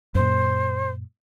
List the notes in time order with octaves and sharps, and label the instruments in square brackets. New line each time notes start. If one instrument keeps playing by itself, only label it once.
[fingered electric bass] F#2 A#2 [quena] C5